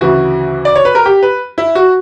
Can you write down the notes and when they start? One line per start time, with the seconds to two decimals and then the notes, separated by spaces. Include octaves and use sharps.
0.01 D2 C#3 E3 F#4
0.65 D5
0.75 C#5
0.85 B4
0.95 A#4
1.06 G4
1.23 B4
1.58 E4
1.75 F#4